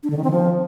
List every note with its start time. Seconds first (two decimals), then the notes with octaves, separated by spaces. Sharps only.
0.03 D4
0.10 D3
0.17 D#3
0.24 C4
0.31 F3